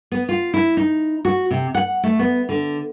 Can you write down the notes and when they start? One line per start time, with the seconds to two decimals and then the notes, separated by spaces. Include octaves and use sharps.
0.12 B3
0.29 F4
0.54 E4
0.77 D#4
1.25 F#4
1.51 C3
1.75 F#5
2.03 A3
2.19 B3
2.49 D3